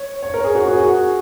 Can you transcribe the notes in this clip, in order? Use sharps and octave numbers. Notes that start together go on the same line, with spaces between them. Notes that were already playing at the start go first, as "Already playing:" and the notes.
Already playing: C#5
C#5
A#4
G#4
F#4
F#4
G#4
F#4